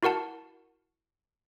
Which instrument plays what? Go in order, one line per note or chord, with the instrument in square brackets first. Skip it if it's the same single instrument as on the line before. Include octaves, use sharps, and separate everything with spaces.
[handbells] E4 F#4 A#4 F#5 A5